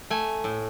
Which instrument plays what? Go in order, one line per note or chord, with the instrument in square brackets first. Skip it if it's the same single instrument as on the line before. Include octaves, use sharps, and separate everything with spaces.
[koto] A3 G#5
A2